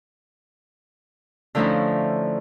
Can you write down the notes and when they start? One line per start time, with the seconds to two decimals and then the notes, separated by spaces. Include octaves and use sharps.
1.55 D3 F3 A3 C#4 D#4 E4